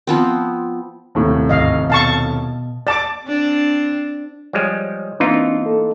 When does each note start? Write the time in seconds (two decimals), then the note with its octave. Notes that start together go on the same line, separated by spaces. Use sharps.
0.07 F3 B3 C4
1.15 D#1 A2 C3
1.49 G1 D2 G#2 D#5 F5
1.90 B2 F5 A5 C#6
2.87 D5 A5 D6 A6 E7
3.24 C4 D4
4.53 F3 G3 G#3 C#5
5.20 E3 A#3 C4 D4 D#4 F4
5.63 A#3 A4